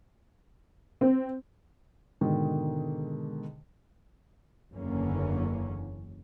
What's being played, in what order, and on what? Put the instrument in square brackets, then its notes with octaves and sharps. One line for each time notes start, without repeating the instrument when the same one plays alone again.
[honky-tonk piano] C4
[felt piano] G#2 B2 D3 D#3
[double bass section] F#1 E2 D3 A#3 C#4